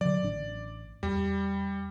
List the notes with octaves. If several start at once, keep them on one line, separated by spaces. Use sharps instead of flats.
D3 F#3 D5
A1 D4
E2 G3